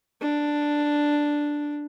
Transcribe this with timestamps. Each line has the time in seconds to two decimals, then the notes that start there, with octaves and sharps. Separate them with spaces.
0.21 D4